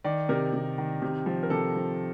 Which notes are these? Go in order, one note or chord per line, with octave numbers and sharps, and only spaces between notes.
D#3 D5
C3 A#4
C3
D#3
C3
F3
A#4
C3 A4
F3